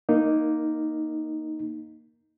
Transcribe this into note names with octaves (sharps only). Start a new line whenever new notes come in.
A#3 D#4